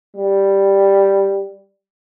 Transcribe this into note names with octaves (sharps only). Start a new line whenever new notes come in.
G3